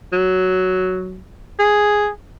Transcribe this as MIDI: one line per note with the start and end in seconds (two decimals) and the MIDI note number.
0.13 1.26 54
1.59 2.09 68